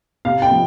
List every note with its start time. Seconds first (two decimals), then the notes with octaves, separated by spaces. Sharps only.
0.25 C3 F5
0.42 G5
0.51 F3